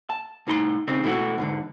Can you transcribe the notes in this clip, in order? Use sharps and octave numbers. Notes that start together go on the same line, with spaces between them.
A5
C2 A2 D#4 A#5 C6
C#3 C4 D#4
B2 E3 A3 E4 F#4
E2 G#2 D3